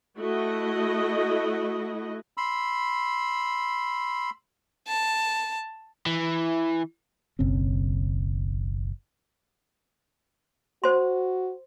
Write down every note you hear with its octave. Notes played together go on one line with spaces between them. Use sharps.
A3 E4 F#4 D#5
B5 C6 E6
A5
E3
F#1 B1 C#3 C4
F#4 C5 C6